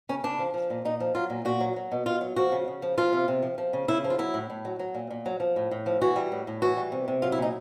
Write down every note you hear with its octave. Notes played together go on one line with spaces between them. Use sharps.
C#3 C#4
C#3 D4
F3
F3
A#2
A#2 D#4
F3
F#3 F4
A#2
A#2 F#4
F#3
F#3
B2
B2 F4
F#3
F3 F#4
C#3
C#3
F3
F3 F4
C3
C3
F3
F3
C#3
C#3 E4
F3
F4
F#3 E4
A2
A2
F#3
F#3
A#2
A#2
F#3
F3
A2
A2
F3
E3 F#4
G3
A2
A2
E3 F#4
G3
C3
C3
F#3 F4
E4
A#2 D#4